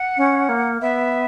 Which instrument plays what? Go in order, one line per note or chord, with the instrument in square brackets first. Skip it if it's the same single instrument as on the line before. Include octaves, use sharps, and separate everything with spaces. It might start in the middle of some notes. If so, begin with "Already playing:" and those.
Already playing: [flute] F#5
[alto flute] C#4
A#3
[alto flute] B3 [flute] E5